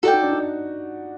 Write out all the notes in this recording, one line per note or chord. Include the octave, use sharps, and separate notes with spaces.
F#4 A4 D5 G5
D#4
D4
D#4